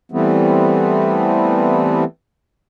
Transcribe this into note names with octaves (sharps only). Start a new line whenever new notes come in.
E3 G3 A3 B3 C4